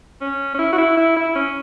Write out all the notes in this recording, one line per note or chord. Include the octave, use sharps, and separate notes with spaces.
C#4
C#4
E4
F#4
E4
E4
E4
C#4